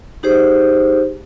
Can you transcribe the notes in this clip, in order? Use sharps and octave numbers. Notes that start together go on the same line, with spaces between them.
D#4 G4 G#4 C5